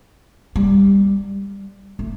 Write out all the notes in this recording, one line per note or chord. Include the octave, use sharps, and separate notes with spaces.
G3
A3